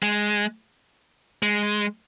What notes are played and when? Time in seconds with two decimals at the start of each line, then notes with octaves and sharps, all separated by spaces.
0.03 G#3
1.43 G#3